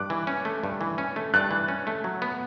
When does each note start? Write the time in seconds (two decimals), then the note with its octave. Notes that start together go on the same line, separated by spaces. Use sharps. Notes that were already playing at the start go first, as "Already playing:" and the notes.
Already playing: G2 D6 F#6
0.10 E3
0.27 C#4
0.45 A3
0.64 G2
0.81 E3
0.98 C#4
1.16 A3
1.34 G2 F#6 A6
1.51 E3
1.68 C#4
1.87 A3
2.04 F#3
2.22 B3